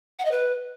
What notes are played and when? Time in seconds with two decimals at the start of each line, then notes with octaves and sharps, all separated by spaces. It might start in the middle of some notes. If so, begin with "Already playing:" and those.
0.19 F#5
0.25 D#5
0.31 B4